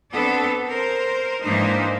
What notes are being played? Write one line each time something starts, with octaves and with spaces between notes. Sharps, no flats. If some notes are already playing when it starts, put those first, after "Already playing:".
B3 C4 D4 A4
A#4 C5
G#2 E3 A#3 D4 D#4 C5